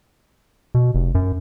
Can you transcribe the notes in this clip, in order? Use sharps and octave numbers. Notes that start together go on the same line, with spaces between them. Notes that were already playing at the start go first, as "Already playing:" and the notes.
B2
F1
F#2